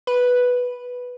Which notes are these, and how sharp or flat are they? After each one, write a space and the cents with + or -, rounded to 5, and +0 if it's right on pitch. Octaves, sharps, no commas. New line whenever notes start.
B4 -5